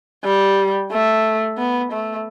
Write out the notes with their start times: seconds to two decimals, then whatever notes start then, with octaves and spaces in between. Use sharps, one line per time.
0.24 G3
0.92 A3
1.58 B3
1.92 A3